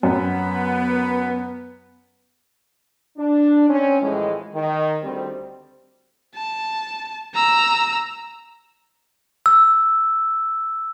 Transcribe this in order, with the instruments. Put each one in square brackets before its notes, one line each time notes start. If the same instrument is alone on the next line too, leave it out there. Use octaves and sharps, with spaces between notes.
[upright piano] F#2 [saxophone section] B3
[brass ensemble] D4
C4 C#4
A2 E3 F3 G#3
D#3
D2 G3 C4
[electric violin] A5
A#5 E6
[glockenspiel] E6